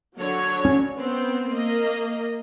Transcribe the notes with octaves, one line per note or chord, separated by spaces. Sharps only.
D3 F#3 C#5
C#4
B3 C4
A#3 D#5